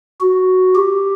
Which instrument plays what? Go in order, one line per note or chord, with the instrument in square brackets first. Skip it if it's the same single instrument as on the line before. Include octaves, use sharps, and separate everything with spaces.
[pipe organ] F#4
G4